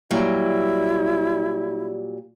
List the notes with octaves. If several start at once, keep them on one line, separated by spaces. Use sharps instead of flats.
A#2 F#3 G3 E4